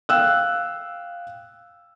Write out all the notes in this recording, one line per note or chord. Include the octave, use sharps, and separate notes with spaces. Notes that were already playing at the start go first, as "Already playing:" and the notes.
F5 G5 E6 F#6